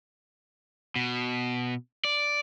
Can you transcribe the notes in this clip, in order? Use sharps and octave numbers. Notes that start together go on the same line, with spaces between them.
B2
D5